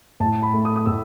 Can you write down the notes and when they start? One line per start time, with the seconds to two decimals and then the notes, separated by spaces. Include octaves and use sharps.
0.20 A2 A5
0.43 B5
0.54 A3
0.65 D#6
0.76 D#6
0.86 A2 E6